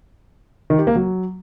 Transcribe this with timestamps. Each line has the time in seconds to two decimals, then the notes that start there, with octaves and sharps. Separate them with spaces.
0.70 D#3
0.78 G4
0.87 A#3
0.96 F#3